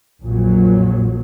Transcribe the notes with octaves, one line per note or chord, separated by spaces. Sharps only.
A#1 F2 A#2 F#3